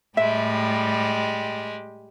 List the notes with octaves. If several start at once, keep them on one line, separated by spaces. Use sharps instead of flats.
A2 G3 G#3 G4 E5